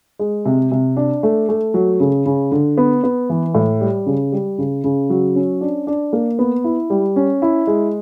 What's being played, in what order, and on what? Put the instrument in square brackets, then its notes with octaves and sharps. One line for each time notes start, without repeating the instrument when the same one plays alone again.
[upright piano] G#3
C3
C3
D4
A3
A3
F#3
C#3
C#3
D3
B3
B3
E3
A2
G3
C#3
G3
C#3
C#3
F#3
C#4
D4
D4
A#3
B3
E4
G3
C#4
E4
G#3